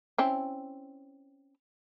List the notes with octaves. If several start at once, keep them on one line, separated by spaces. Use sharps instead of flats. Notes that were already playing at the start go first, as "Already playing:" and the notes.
C4 C#4 E4